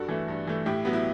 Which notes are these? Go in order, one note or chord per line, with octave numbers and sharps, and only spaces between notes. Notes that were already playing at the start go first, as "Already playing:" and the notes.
Already playing: G2 F#4 A4
E3 A3
G2
E3 A3
A2 E4 G4
F#3 B3
E4